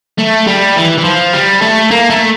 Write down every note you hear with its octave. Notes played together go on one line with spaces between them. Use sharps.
A3
G3
E3
E3
F3
G3
A3
A#3
A3